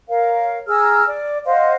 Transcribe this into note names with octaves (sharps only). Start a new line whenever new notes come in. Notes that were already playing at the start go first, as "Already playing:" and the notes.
A#4 C#5 F5
G#4 A#5 E6 F6
D5
C5 D#5 F5 F#5